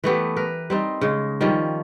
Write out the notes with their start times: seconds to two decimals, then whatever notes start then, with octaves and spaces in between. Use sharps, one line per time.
0.04 E3 A3 B3 G4
0.37 A#4 B4
0.70 G3 C4 D#4
1.01 C#3 G#3
1.41 D#3 F3 G3 C#4